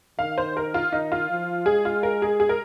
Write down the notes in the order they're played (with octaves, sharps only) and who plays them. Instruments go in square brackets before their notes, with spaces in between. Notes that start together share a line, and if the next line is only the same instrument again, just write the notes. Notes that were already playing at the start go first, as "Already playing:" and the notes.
[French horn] D#3 [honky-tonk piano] F5
[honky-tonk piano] C5
A#4
F4
[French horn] D#3 [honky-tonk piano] D#4
[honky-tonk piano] F4
[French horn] F3
[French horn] G#3 [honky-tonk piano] G#4
[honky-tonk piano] F4
A#4
G#4
G#4
A#4